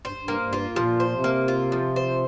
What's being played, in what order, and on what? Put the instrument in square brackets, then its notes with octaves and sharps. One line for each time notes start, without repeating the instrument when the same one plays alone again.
[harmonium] G2 [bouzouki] C5
[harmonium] G2
[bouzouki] A#3
[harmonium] G2
[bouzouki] F4
[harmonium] G2
[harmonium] A#2 [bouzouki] F3
[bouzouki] C5
[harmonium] C3
[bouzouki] A#3
F4
F3
C5